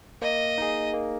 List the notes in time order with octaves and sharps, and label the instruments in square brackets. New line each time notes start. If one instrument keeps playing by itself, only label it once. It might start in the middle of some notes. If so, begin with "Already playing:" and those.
[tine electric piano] A#3 [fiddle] D#5
[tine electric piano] D#4 G#4
A#3